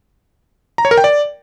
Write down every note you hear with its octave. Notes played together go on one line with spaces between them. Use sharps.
A#5
C#5
A#4
G5
D5